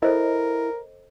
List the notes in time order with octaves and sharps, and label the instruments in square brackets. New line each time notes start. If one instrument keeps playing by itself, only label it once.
[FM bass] E4 [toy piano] A4 C5 D#5 [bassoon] A#4